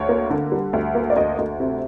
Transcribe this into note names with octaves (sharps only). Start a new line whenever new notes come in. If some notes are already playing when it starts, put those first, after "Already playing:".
Already playing: D2 C#5
A#3
D3
G3
D2
A#3
D5
D2 D#5
D2
C3